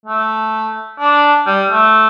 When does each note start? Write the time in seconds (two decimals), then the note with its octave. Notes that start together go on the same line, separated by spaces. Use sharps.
0.06 A3
1.00 D4
1.47 G3
1.70 A3